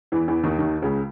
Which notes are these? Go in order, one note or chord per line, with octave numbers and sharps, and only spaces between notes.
E2 E3
E2 E3
D#2 D#3
D#2 D#3
C#2 C#3